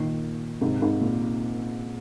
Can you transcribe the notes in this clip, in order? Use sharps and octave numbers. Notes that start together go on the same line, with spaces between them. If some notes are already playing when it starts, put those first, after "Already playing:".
Already playing: A#2 D#3
G#2 C3
G#2 C3
A#2